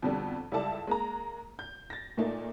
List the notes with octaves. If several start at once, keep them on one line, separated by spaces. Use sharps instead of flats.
F2 B2 D3 G3 A4
C#2 G3 E4 A4 D5 A5
G#3 A#3 A#5
G6
A6 A#6
A#2 A3 A#3 D#4